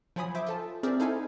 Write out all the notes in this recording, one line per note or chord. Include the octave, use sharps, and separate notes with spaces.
F3 F#3 F4 G#5 B5 D#6
C5 E5 D6
F4 A4 A5
C4 G#4 A#4 C5 D5 E5
D#4 E4 A4 C5 F5 G#5